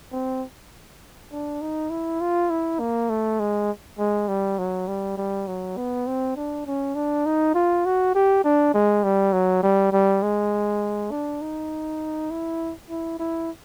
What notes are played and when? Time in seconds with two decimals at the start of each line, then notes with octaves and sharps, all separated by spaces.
0.12 C4
1.32 D4
1.61 D#4
1.90 E4
2.21 F4
2.50 E4
2.79 A#3
3.10 A3
3.40 G#3
3.99 G#3
4.28 G3
4.59 F#3
4.88 G3
5.17 G3
5.47 F#3
5.77 B3
6.07 C4
6.36 D4
6.66 C#4
6.95 D4
7.26 D#4
7.55 F4
7.85 F#4
8.15 G4
8.44 D4
8.74 G#3
9.04 G3
9.33 F#3
9.63 G3
9.93 G3
10.23 G#3
11.11 D4
11.42 D#4
12.31 E4
12.90 E4
13.19 E4